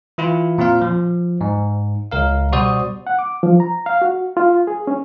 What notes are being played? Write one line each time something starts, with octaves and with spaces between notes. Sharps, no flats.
E3 E4 F4
A#2 C4 F4 F5
F3
G#2
C#2 A#4 F5
B2 G3 F#4 C5 D5 D#6
F#5
D6
F3
A#5
F5
F#4
F4
G#4
C#4